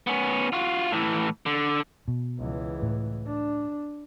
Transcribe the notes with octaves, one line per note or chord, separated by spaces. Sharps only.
B3 C#4
F4 F#4
A2 E3
D3
B2
C#2 E3
A2
D4